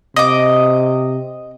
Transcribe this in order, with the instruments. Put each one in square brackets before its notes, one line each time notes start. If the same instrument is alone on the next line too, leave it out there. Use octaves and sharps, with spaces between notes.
[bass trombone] C3 [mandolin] D#5 D6